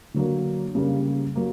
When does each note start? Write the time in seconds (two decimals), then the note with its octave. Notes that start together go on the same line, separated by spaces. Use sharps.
0.14 D3 F#3 A#3
0.75 C#3 G3 A#3
1.35 F#3 A#3